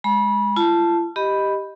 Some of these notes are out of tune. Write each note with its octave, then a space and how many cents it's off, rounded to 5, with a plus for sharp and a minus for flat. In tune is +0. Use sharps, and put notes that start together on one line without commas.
G#3 +0 B5 -30
F4 -40 A5 +0
G4 +0 D#5 +0 B5 +0